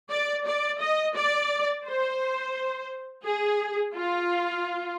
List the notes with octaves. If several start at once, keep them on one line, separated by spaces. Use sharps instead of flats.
D5
D5
D#5
D5
C5
G#4
F4